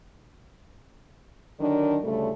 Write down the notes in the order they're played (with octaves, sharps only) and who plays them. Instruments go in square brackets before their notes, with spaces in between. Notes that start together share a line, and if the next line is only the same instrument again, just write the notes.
[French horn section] D3 D#3 F#3 D4
D2 A2 C#3 G3 A3